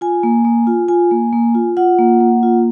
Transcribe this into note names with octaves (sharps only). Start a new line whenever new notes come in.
F4 G#5
A#3
A#3
F4
F4 G#5
A#3
A#3
F4
F4 F#5
A#3
A#3
F4